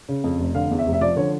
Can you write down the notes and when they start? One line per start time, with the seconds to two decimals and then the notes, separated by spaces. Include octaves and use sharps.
0.09 C#3
0.24 F2
0.39 F1
0.55 D3 F5
0.71 E2
0.79 E5
0.87 F1
0.93 E5
1.01 F3 D5
1.16 D3 C#5